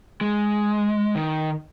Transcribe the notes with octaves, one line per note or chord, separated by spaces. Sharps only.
G#3
D#3